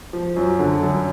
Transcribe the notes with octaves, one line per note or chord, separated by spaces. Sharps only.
F3
F#2
D3
F#2